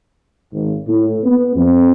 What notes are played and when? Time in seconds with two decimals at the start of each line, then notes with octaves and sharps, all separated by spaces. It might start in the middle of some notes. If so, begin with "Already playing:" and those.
0.52 G#1
0.88 A2
1.23 B3
1.55 F2